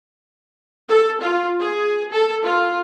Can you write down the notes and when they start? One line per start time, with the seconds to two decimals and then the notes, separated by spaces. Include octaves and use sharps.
0.88 A4
1.21 F4
1.59 G#4
2.11 A4
2.44 F4